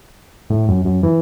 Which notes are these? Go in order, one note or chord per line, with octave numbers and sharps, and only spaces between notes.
A2
F#2
F#2
E3